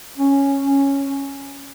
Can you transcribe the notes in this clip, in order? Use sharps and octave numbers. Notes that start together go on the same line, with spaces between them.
C#4
C#4